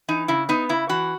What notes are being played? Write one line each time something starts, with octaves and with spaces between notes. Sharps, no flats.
E3 D#4
C#3 E4
B3 D#4
C#3 E4
E3 F#4